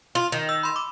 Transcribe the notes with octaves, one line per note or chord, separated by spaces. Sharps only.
F4
D#3
E6
B5 C6
D6